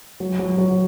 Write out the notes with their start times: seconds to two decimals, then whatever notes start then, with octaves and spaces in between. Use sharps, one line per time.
0.20 F#3
0.39 F#3
0.58 F#3